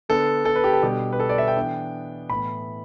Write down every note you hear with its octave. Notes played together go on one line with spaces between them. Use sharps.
D3 B3 D4 A4
A4
B4
G4
A4
B2 G3 D4 G4
B4
A4
D5
E5
G5
E3 B3 D4
A2 E3 B3 B5